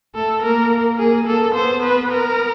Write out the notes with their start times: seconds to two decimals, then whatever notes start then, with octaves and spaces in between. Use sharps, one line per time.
0.15 A3 A4
0.43 A#3 A#4
0.99 A#3 G#4
1.27 A#3 A4
1.55 B3 C5
1.83 B4
2.11 A#4